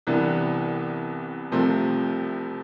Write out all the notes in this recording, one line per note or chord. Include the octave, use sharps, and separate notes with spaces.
C2 C3 E3 B3 D4
C2 C3 F3 A3 C4